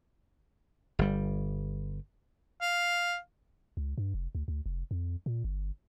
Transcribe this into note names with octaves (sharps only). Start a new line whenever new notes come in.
G1 G3
F5
C#2
G2
F1
D2
D2
F1
F2
A#2
G1